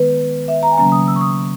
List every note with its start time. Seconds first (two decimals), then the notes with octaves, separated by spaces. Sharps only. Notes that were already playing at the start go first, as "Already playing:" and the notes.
Already playing: D#3 G#3 B3 B4
0.48 E5
0.63 A#5
0.71 G#5
0.77 C#3 F#3 A#3 C#4 A#5
0.92 D#6
1.08 E6
1.16 C#6
1.21 D#6